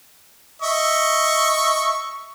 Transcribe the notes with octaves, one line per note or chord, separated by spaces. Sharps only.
D#5 E5 C#6